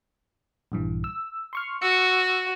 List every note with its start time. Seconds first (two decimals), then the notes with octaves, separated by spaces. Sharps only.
0.72 A#1 G2 E3
1.04 E6
1.53 C6 C#6 F6
1.82 F#4 E6 C#7